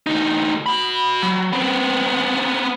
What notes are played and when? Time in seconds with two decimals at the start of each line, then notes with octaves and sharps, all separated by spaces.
0.07 D2 D#4
0.66 F#4 B5
1.22 F#3
1.53 B3 C4